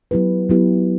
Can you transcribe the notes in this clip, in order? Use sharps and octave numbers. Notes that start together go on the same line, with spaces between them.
F#3 B3 E4 G4 B4
F#3 B3 E4 G4 B4